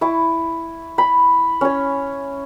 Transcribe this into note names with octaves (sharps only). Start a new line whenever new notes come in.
E4 C#6 D6
B5
C#4 C#5